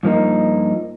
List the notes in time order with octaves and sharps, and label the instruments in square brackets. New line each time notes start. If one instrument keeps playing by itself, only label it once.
[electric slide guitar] G2 F3 A#3 D#4